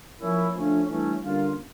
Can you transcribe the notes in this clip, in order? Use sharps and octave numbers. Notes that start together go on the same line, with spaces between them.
F3 A#3 C#4 E4
D3 F3 A3 C#4
G2 E3 A3 C#4
D3 G3 A#3 C#4 F4